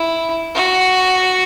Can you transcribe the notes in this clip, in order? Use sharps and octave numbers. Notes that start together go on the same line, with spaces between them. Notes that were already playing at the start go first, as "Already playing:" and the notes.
Already playing: E4
F#4